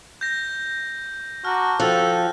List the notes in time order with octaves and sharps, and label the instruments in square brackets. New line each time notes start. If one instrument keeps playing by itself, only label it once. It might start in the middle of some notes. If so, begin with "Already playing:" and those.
[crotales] G6 A#6
[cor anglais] F#4 [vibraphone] A5 A#5 D6 [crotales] F6
[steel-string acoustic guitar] F3 [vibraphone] F#4 G5 [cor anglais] A4 [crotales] F#6